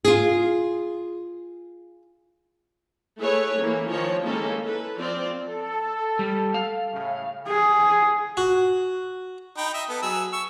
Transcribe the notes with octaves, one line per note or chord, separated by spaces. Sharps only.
F4 G#4
A3 E4 G#4 B4 C#5
E3 A#3 C#4
D#3 F3 C#5
G#3 A#3 C#4 D#4 E4 A4
A4 B4
F3 C4 F4 D5
A4
G3
F5
A2 C#3
G#4
F#4
D#4 G5 B5
D#5 E5
B3 A4
F#3 G#4 E6
C#6 E6